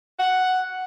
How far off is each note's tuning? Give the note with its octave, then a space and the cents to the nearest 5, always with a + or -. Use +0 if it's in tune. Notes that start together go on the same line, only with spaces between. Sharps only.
F#5 +0